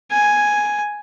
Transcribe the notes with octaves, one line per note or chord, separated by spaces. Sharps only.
G#5